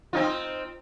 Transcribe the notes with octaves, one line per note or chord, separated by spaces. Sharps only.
C4 D#4 F4